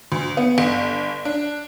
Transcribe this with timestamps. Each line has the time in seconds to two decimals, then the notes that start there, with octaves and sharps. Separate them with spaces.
0.12 D2
0.37 B3
0.58 G1
1.25 D4